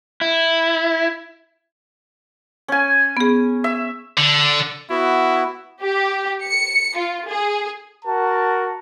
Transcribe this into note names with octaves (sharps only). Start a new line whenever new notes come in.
E4
C#4 G#5
B3 G#4
E5
D3
B3 E4 F#4
G4
C#7
F4
G#4
F#4 A#4 A5